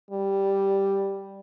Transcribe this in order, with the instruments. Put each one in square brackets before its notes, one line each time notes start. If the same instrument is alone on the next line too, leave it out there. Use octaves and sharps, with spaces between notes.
[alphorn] G3